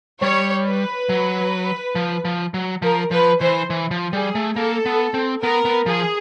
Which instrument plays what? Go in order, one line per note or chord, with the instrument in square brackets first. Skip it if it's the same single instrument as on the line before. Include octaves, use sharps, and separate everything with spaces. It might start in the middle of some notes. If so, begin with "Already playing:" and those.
[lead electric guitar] G3 [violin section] C#5
[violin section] B4
[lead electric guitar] F#3
F3
F3
F#3
[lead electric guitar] F3 [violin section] A#4
[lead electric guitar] F3 [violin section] B4
[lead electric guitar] E3 [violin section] C5
[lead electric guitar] E3
F3
[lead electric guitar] G3 [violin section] G#4
[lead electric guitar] A3
[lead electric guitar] A#3 [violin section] A4
[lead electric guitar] B3
C4
[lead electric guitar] B3 [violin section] A#4
[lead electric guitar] B3
[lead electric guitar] F3 [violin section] G#4